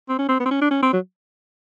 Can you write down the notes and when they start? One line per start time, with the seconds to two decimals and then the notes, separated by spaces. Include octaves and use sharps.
0.09 C4
0.19 C#4
0.29 C4
0.40 B3
0.46 C4
0.51 C#4
0.62 D4
0.71 C#4
0.83 C4
0.93 F#3